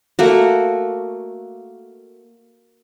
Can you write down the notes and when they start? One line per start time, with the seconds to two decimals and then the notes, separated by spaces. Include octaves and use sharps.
0.19 A3 A#3 F#4